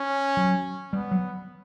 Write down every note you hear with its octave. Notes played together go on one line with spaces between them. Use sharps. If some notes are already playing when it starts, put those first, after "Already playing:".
Already playing: C#4
F#3
G3 B3
F#3